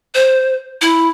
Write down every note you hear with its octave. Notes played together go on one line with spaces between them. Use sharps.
C5
E4